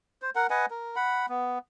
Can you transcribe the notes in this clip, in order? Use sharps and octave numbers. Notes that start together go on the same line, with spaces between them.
C5
A#4 F#5
B4 D#5 F#5 G#5
A#4
F#5 B5
B3